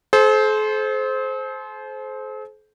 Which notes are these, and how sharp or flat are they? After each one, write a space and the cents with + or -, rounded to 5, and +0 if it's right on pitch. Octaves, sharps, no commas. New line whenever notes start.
A4 -45 C5 +0